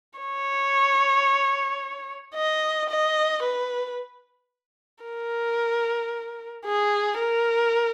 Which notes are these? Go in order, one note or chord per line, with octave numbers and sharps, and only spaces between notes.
C#5
D#5
D#5
B4
A#4
G#4
A#4